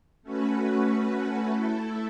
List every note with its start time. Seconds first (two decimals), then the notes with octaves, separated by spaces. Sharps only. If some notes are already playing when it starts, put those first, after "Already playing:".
0.22 A3 C#4 F#4 B4
1.48 A3 E4 A4